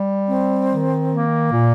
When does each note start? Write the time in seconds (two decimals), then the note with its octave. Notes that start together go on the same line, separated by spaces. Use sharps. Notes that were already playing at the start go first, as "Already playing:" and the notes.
Already playing: G3
0.27 C4
0.68 D#3
1.10 A#3
1.53 A#2